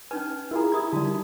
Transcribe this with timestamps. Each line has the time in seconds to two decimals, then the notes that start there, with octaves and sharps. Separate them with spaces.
0.11 C#4 D#4 B4 G#5
0.51 E4 F4 G#4 A#4 A#5
0.72 E4 G4 D#6 G#6
0.93 D3 G3 F#4 A5
1.06 D#4